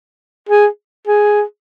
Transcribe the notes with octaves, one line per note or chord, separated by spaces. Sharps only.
G#4
G#4